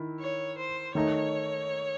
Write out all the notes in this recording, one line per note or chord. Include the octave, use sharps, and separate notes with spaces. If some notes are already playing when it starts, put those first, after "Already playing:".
Already playing: D#3 E4
C#5
C5
D#3 A3 D#4 C#5